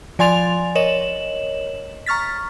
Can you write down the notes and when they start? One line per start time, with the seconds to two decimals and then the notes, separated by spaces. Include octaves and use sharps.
0.19 F3 D5 G#5 C6 A6 F7
0.75 A#4 C#5 D#5 E7 F#7
2.06 A#5 C#6 F6 A6 B6